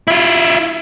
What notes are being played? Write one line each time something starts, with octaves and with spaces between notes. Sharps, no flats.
E4 F4